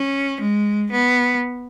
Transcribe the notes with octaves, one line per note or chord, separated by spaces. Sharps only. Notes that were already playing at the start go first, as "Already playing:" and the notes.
Already playing: C#4
G#3
B3